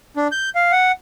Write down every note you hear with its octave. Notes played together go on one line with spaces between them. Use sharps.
D4
G6
F5
F#5